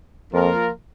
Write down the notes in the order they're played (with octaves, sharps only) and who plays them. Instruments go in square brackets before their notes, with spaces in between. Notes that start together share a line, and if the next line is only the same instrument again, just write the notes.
[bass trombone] F2 [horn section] F3 A#3 F4 A#4